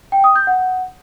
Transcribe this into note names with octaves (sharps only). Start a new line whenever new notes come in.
G5
D#6
G6
F#5